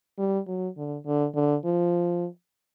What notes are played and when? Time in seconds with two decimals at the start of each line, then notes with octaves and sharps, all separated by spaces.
0.18 G3
0.47 F#3
0.77 D3
1.06 D3
1.35 D3
1.65 F3